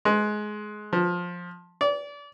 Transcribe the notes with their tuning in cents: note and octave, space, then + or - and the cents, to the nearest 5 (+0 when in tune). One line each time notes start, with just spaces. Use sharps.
G#3 +20
F3 +15
D5 -30